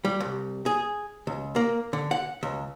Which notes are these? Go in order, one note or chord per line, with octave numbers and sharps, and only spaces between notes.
G3
C2
G#4
C#2
A#3
D3
F#5
C#2